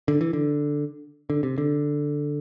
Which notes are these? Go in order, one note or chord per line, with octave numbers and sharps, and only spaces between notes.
D3
E3
D3
D3
C3
D3